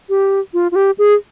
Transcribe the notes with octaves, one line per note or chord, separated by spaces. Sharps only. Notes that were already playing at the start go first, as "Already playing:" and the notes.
G4
F4
F4
G4
G#4